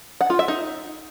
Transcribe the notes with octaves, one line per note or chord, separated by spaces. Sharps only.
F#5
F4
E5
D#4